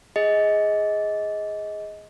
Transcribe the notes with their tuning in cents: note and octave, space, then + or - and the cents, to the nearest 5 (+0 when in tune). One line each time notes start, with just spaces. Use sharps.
G#4 +0 D#5 +20